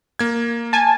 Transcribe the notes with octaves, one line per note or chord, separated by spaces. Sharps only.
A#3 G#6
G#5 A5